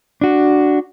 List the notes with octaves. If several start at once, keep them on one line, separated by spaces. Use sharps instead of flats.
D4 F#4